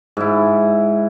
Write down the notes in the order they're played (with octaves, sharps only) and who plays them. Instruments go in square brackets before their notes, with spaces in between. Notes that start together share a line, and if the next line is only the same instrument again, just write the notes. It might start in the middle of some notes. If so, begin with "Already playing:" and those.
[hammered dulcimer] G#2 E4